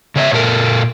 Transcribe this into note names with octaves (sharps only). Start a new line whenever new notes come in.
C#3 C#5 D#5 E5
A#2 A4 A#4